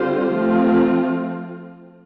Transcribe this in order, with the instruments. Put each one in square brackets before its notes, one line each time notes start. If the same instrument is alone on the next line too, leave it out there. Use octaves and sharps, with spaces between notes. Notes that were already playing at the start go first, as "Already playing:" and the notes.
Already playing: [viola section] D3 G3 C4 F4 C5
F3 A3 C4 F4